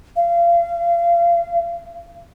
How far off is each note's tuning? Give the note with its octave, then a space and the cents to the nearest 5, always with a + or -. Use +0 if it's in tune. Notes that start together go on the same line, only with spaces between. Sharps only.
F5 -30